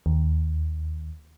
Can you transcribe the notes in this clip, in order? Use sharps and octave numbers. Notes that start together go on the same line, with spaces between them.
D#2